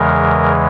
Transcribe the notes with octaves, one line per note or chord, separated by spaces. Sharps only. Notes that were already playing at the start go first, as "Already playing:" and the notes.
Already playing: E2 C#3 E3 G#3 A#4